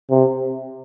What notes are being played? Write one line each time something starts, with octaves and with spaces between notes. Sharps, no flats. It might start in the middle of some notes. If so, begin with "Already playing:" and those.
C3